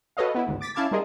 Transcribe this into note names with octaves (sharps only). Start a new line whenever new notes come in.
F#4 A4 B4 C#5 D#5 F5
B3 E4
G1 D2 G#2
D6 A6 B6
C#4 E4 F5 A5 D6 G#6
G3 D#4 F4 G#4 A#4 D#5